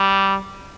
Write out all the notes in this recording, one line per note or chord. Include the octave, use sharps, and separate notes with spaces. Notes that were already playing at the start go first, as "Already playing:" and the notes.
Already playing: G3